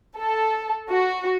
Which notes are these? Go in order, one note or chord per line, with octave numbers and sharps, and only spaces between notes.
A4
F#4